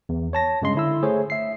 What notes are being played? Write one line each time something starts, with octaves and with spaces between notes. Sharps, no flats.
E2
C#5 A5 A#6
G2 C#3 G#3 C6
D3 E4 E6
A3 G#4 C5 C#5
E5 C7